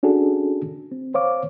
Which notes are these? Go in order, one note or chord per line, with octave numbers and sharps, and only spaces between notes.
C#4 D4 F#4 G#4 A4
C4
C5 C#5 F5 D6